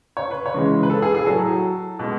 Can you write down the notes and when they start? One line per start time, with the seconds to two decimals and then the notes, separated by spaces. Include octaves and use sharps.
0.17 C#5
0.31 B4
0.46 C#5
0.54 C#3 E3 G#3
0.83 B4
0.90 A4
1.02 G#4
1.15 G#4
1.26 A2 F#3 A4
1.99 B2 G#3